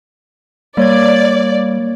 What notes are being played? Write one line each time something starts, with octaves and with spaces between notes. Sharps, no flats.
G3 A#3 C#5 D5 G#6